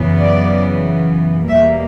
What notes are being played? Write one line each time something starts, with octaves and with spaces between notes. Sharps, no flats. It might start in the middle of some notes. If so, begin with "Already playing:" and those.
Already playing: F#2 C#3 E3 B3
D5
E2 B2 G3 A#3 E5